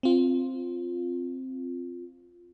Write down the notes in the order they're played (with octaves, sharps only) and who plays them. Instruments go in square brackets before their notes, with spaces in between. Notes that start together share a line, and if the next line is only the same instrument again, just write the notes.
[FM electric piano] C4 F4